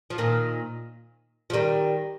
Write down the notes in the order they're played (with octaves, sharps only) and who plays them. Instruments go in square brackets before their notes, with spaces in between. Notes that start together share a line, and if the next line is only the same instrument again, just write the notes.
[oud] F3
A#2 D#3
F3
D#3 G3